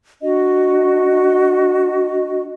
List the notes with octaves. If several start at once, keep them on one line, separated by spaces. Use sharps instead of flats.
D4 F#4 D#5